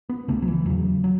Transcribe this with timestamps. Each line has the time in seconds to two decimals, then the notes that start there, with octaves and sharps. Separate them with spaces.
0.09 B3
0.28 C#2 C#3 A3
0.42 F#3
0.48 E3
0.66 E2 C#3 F#3
1.04 F#3